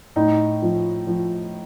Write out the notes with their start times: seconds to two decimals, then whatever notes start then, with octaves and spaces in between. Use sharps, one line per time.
0.16 A2 D#4
0.62 F3
1.07 F3